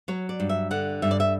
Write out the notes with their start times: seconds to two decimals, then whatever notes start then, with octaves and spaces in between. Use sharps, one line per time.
0.08 F#3 C#5
0.29 D5
0.40 G2
0.49 E5
0.71 D3 F#5
1.02 G2 E5
1.11 D5
1.20 E5